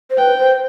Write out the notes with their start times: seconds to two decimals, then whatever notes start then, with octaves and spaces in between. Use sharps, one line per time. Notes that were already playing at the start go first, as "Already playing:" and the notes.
0.10 C5
0.18 B4 G5
0.38 C5